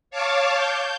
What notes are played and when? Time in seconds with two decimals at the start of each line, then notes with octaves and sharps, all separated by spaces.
0.11 C#5 F5 A5 D6
0.55 G6